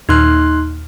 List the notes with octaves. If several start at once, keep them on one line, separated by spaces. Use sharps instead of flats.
D#2 A#2 D#4 C6 F6 F#6